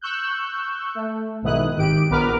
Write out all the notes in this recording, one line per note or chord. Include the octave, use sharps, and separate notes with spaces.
C#6 E6 F#6 G6
A3
B1 G#2 D#3 E4 D#6 F#6
G#1 D#3 G4 D7
A#1 B3 A#4 B4 D6 F6